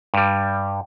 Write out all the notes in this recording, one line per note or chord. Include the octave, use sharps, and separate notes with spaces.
G2 G3